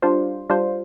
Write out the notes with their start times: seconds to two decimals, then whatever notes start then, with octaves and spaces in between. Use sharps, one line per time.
0.02 G3 D4 F4 C5
0.50 G3 D4 F4 C5